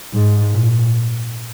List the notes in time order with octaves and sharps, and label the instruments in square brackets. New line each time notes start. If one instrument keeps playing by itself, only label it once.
[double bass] G#2
A#2